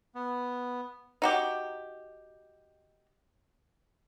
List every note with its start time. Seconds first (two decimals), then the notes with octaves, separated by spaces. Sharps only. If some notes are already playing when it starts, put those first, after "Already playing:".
0.15 B3
1.22 D#4 F#4 G4